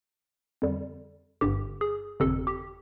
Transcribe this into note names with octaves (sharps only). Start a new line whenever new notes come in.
F2 D3 G3
G1 G2 D3 G4
G#4
G1 F2 C3 A4
G4